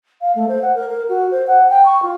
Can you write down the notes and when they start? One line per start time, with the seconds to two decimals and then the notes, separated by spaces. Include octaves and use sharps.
0.21 F5
0.35 A3
0.48 C5
0.62 F#5
0.75 A#4
0.89 A#4
1.09 F#4
1.31 C5
1.47 F#5
1.70 G5
1.86 C#6
2.02 F4